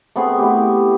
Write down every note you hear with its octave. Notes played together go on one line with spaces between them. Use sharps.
A3 B3 C4 G#4
E4 G4